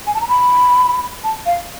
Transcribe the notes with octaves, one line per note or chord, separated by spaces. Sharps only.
G#5
A5
A#5
B5
A5
F5